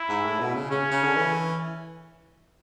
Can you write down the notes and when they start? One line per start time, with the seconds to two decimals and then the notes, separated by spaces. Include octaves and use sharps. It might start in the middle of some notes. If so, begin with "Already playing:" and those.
Already playing: E4
0.09 G#2
0.25 A2
0.39 B2
0.55 C#3
0.70 C#3 C#4
0.91 C#3
1.03 D3
1.16 E3